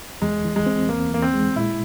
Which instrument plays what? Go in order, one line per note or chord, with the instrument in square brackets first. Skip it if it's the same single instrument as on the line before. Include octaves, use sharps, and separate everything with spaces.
[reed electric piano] E2 [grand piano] G#3
[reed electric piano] E3
[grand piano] G#3
[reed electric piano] C4
[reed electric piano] E2 [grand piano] A#3
[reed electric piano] E2 [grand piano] A#3
[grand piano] C4
[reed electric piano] G#3
[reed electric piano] A#2 [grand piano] E4